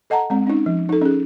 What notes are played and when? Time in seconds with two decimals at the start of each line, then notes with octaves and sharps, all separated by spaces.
0.10 A4 D#5 F#5 A5 A#5
0.30 G#3 C4
0.47 C#4 D#4
0.66 F3
0.89 D#4 A4
1.01 C#4 G#4